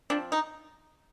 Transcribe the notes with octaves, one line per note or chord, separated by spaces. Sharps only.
F3 C4 D4
D#4